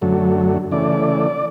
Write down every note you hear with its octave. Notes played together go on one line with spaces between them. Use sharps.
F#2 D3 F#3 A3
C#3 E3 A3 D5